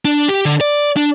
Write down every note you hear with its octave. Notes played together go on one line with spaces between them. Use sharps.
D4
G4
D3
D5
D4